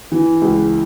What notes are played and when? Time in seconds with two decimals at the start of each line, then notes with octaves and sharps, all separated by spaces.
0.12 E3
0.42 C#2